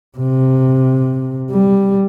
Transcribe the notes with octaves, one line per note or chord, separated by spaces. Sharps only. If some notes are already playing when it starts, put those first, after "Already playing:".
C3
G3